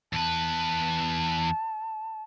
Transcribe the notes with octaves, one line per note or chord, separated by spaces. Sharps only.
E2 B4 A5